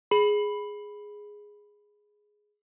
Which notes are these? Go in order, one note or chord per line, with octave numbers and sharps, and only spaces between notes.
G#4 B5